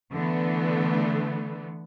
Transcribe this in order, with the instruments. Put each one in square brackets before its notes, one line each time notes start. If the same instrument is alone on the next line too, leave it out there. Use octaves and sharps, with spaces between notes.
[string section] D3 E3 A3 B3